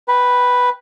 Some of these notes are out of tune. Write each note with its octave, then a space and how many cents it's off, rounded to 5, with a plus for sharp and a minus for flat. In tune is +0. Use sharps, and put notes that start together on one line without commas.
B4 +0 G5 +0